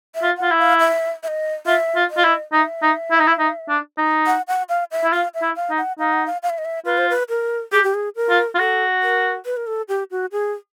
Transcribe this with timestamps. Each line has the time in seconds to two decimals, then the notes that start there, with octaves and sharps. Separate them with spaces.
0.15 E5
0.23 F4
0.37 F4 F#5
0.51 E4
0.59 F5
0.80 E5
1.23 E5
1.28 D#5
1.67 F4 E5
1.96 F4
2.10 D#5
2.17 F4
2.24 E4
2.53 D#4 E5
2.82 D#4
3.11 E4
3.19 D#4
3.27 E4
3.39 D#4
3.69 D4
3.98 D#4
4.27 F#5
4.48 F#5
4.69 F5
4.91 E5
5.04 E4
5.13 F4 F5
5.34 E5
5.42 E4
5.56 F5
5.70 D#4
5.78 F#5
5.99 D#4 F5
6.13 F#5
6.26 F5
6.43 F5
6.50 E5
6.58 D#5
6.65 E5
6.85 F4 B4
6.98 C5
7.10 B4
7.29 A#4
7.72 G4 G#4
7.83 G4
7.94 G#4
8.16 A#4
8.30 F4
8.55 F4
8.59 F#4 A4
9.02 A#4
9.46 B4
9.57 A#4
9.67 A4
9.88 G4
10.11 F#4
10.32 G#4